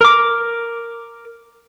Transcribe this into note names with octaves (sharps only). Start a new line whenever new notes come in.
A#4 D6